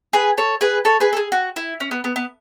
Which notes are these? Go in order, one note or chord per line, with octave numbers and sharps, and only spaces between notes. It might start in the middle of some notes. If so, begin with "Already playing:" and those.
G#4 B4
A4 C#5
G#4 B4
A4 C#5
G#4 B4
A4
G#4
F#4
E4
C#4
B3
B3
B3